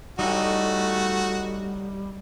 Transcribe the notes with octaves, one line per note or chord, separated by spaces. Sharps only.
A2 G3 A3 D#4 F#4